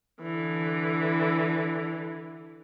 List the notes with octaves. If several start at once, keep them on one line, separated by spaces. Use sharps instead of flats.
D3 E3